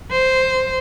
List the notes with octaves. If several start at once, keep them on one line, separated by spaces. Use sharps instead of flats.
C5